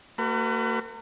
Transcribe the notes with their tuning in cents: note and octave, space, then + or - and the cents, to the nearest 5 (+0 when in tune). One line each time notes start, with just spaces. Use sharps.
A#3 -40 F#4 +20 B4 +30